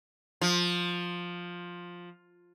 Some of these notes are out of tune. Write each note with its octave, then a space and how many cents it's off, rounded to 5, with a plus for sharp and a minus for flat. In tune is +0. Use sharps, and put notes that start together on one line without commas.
F3 +10